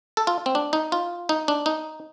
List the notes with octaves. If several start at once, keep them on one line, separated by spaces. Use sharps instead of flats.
A4
F4
C4
D4
D#4
F4
D#4
D4
D#4